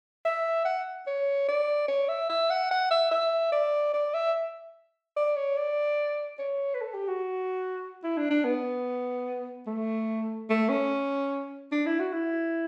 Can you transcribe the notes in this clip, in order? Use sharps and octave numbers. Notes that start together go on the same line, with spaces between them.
E5
F#5
C#5
D5
C#5
E5
E5
F#5
F#5
E5
E5
D5
D5
E5
D5
C#5
D5
C#5
B4
A4
G4
F#4
E4
D4
D4
B3
A3
A3
C#4
D4
E4
F#4
E4